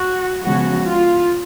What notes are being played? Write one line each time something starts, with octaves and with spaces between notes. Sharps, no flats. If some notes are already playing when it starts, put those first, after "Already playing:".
Already playing: F#4
C#3 F3 G#3 B3 F#4
F4